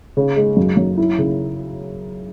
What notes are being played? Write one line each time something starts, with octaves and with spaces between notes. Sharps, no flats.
C#3
G#3
F#2
F#2
E4
C#3